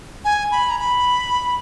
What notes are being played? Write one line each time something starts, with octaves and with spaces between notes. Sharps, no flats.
G#5
B5
A#5
B5